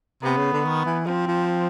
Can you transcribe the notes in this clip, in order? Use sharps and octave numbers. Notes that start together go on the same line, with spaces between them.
C3 B3
C#3
D3
D#3
E3
F3 C4
F3